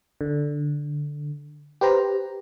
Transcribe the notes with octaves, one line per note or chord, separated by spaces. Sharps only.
D3
G4 B4 C5 A#5